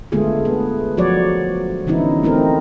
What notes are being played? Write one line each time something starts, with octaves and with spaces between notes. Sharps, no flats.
D3 G#3 A3 B3 F4 G#4
B3
F3 F#3 F#4 C#5 D5
D3 E3 B3 C#4 D#4 E4
A3 C4 D#4 A#4